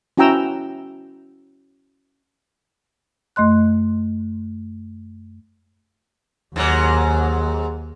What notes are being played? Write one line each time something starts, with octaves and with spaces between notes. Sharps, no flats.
C#4 E4 F#4 G5 A#5 E6
F#2 A3 D#5 C6 F#6
D#2 G#2 F#3